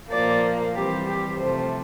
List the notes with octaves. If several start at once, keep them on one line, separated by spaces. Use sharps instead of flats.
A#2 F3 A#3 D5
E3 G3 C4 G4
G4
C3 F3 A3 C5